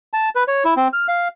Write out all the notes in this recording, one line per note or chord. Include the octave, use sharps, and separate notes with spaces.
A5
B4
C#5
E4
C4
F6
F5